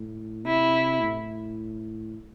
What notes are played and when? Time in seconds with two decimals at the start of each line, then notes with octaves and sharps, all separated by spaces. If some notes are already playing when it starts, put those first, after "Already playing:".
Already playing: A2
0.45 C3 E4
1.00 A2